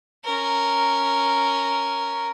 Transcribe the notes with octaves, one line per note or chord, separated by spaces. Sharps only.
C#4 A#4